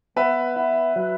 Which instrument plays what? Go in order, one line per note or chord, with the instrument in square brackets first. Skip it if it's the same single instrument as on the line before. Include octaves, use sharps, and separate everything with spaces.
[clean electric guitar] B3 [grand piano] B4 E5
[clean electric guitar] E4
F#3